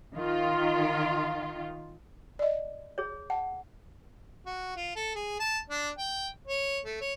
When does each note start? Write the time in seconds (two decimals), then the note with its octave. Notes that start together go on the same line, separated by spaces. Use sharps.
0.14 D#3 F4
2.39 D5 D#5
2.98 G#4 C#5
3.30 F#5 A5
4.46 F#4
4.76 F4
4.96 A4
5.15 G#4
5.40 A5
5.70 D4
5.98 G5
6.47 C#5
6.85 A3
7.01 C#5